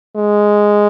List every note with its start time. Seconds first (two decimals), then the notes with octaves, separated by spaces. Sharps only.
0.16 G#3